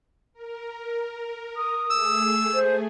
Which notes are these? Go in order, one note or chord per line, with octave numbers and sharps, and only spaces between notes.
A#4
D#6
A3 G#4 E6
C5